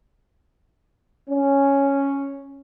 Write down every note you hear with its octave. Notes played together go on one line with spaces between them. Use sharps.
C#4